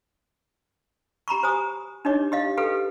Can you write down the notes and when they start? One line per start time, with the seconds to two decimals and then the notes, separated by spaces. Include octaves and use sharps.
1.28 G4 A#5 B5 C#6
1.43 F#4 C5 G#5 A#5 D#6
2.05 D4 D#4 G4 C#5 D#5 D6
2.32 G4 D#5 F5
2.58 G4 A4 B4 F5 G5